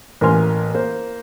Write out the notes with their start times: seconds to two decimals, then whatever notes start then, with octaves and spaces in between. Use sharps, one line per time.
0.21 A1 A#3 A#4 G#5 C6 F6
0.74 A#3 C5